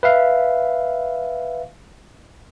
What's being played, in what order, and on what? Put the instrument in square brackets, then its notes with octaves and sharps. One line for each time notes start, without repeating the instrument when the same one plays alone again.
[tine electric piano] B4 E5 F5